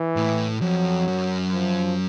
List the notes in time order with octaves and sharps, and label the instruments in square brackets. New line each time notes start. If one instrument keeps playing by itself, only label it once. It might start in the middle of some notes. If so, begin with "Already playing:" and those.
Already playing: [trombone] E3
[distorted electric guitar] A2
[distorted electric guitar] F2 [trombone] F#3
[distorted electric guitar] F#2
[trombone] F3